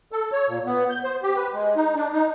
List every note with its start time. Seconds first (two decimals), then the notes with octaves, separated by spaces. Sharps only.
0.12 A4
0.32 C#5
0.47 A#2
0.66 B3
0.90 G6
1.03 C5
1.23 G4
1.36 B4
1.53 G#3
1.76 D#4
1.95 D4
2.13 D#4